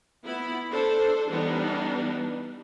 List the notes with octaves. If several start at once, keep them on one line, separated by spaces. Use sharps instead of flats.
B3 E4 B5
D4 A4 C5
E3 G3 B3 D4 D#4